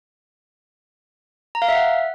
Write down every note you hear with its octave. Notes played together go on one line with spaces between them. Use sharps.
A#5
F5
E5
F#5